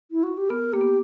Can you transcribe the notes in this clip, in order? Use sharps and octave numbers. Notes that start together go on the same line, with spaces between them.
E4
F#4
G4
B3 A#4
A#3 G4
B3